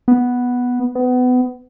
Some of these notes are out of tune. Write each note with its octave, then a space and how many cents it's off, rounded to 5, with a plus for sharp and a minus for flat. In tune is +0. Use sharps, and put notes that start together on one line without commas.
B3 -5
B3 +25